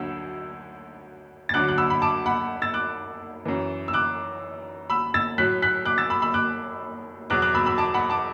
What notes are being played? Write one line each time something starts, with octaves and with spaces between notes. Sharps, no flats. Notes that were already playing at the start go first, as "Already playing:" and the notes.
Already playing: D2 D3 F#3 E6
A6
D2 D3 F#3 D6 F#6
F#6
B5 E6
B5
A5 D6
F#5 B5
E6 A6
D6 F#6
F#2 E3
E6
D6 F#6
B5 E6
E6 A6
A2 F#3 F#6 B6
F#6 B6
D6 F#6
E6 A6
B5 E6
B5 E6
D6 F#6
E2 B2 F#3 D6 F#6
D6 F#6
B5 E6
B5 E6
A5 D6
F#5 B5
A5 D6